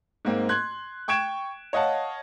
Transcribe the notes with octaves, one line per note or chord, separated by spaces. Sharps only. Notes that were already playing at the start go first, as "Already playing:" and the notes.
G#2 A#3 C4
C6 F#6 G#6
G5 C#6 G#6 D7 E7
C#5 D#5 F5 F#5 A5